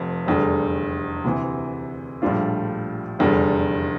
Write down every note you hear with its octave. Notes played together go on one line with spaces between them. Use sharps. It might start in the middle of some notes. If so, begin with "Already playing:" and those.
Already playing: F1 F2
F1 E2 D3 G3
D2 C3 E3
A#1 A2 G3 D4 F4
F1 E2 D3 G3